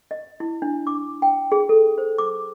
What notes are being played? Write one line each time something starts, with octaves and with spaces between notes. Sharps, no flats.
D#5
E4
D4
D6
G5
G#4
A4
C5
D6